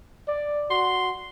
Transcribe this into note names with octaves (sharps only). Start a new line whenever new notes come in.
D5
F#4 C6